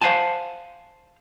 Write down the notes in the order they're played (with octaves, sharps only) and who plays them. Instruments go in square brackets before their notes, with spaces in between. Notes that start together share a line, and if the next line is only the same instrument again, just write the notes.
[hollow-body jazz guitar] C5 F5 F#5 G#5 A5